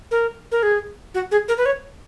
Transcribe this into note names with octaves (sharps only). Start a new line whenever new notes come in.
A#4
A#4
G#4
F#4
G#4
A#4
B4
C#5